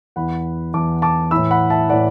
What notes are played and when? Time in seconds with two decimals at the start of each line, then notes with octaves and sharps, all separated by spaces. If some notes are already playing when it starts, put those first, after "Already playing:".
0.16 E2 E3 F#5 B5
0.74 E2 E3 A5 D6
1.02 A5 D6
1.31 A2 E3 B5 E6
1.51 F#5 B5
1.70 E5 A5
1.89 A2 E3 D5 F#5